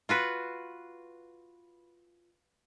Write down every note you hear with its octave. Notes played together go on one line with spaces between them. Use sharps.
F4 F#4 B4